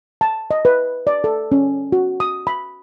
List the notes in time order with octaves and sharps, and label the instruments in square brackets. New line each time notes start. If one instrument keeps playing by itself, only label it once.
[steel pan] A5
D#5
B4
D5
A4
C#4
F#4
D#6
B5